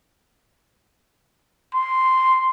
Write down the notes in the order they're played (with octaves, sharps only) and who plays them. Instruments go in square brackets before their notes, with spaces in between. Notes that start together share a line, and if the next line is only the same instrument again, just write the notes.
[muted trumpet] C6